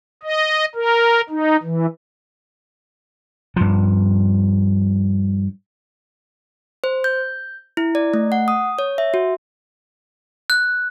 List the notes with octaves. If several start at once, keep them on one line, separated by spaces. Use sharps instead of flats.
D#5
A#4
D#4
E3
G2 F3
C5
G6
E4
D5
A3
F#5
D#6
C#5
E5
F#4
F#6